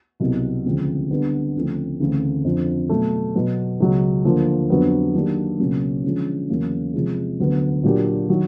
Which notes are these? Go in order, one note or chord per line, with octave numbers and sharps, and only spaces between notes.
C2 B2 F#3
D2 C#3 F3 G#3 C4
D3 G3 B3
D2 C#3 F3 A3 C4
D2 C#3 E3 A3 C4
F2 D3 F3
B2 F#3 A3
B2 F#3 B3
C#2 B2 F#3
D2 D3 F3 A#3
F2 D3 F#3 B3 D4
D#3 F#3 A#3 D4 G4
C#2 B2 F#3 A#3 C#4
D3 F3 G#3 C#4
E2 C#3 F#3 A#3 C#4
C3 F3 G#3
D2 D3 F#3 B3
A#2 F#3 A#3 D4 G4
D#3 F#3